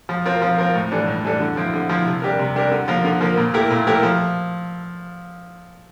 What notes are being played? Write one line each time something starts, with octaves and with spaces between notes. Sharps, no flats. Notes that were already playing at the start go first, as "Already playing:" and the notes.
F3
C4 F4 A#4
F3
C4 F4 A#4
A2
E3 G3 D4 A4
A2
E3 G3 D4 A4
D3
F3 C4 E4
D3
F3 C4 E4
C3
G3 D4 G4 A#4
C3
G3 D4 G4 A#4
D3
F3 A#3 F4 A#4
D3
F3 A#3 F4 A#4
A#2
A3 E4 G4 A#4
A#2
A3 E4 G4 A#4
F3